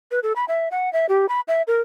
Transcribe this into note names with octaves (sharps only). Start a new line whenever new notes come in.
B4
A4
B5
E5
F#5
E5
G4
B5
E5
A#4